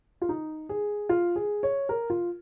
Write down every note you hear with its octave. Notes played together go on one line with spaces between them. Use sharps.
F4
D#4
G#4
F4
G#4
C#5
A#4
F4